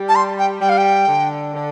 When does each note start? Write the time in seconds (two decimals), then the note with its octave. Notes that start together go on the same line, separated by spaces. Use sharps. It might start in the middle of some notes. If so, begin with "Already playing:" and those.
Already playing: G3
0.09 A5
0.16 C6
0.39 G5
0.61 G3 G5
0.69 F5
0.78 G5
1.08 D3
1.54 D3